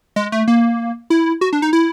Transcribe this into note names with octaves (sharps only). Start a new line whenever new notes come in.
G#3
A3
A#3
E4
F#4
D4
D#4
E4